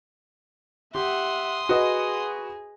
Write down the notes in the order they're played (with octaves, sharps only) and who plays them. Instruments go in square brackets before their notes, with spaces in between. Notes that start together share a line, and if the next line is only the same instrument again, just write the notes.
[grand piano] G4 [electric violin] E5 F#5 [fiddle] C6 D#6
[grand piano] F#4 B4 D#5 [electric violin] G#4